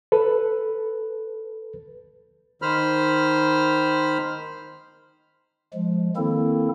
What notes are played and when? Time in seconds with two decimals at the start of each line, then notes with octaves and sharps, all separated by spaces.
0.12 A4 B4
2.62 D#3 C5 B5 F6
5.74 F3 G#3
6.17 D#3 A#3 C4 E4 A4